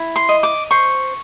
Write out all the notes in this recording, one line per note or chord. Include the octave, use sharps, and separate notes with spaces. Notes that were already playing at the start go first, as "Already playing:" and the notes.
Already playing: E4
C6
D#5
D6
C5 C#6